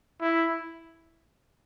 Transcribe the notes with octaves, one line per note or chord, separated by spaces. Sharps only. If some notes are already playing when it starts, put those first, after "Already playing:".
E4